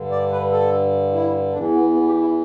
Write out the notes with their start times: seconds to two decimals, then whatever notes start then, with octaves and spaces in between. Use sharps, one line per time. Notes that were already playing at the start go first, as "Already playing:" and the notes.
Already playing: G2 D3
0.12 D5
0.32 B4
0.52 A4
1.13 E4
1.53 E2 E3 D4
1.74 B3
1.93 B3
2.07 G4
2.21 E4